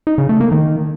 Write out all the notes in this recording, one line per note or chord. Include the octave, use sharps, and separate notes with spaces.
D#4
C#3
A3
A#3
D#3